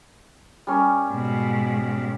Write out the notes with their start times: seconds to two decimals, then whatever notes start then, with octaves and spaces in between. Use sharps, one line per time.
0.67 G3 C#4 A#4
1.12 G#2 B2